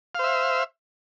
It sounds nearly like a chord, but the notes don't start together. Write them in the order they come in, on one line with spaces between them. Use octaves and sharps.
F5 C5 E5